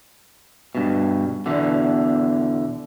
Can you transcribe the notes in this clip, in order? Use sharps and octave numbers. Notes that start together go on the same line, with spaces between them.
G2 B2
E2 B2 D3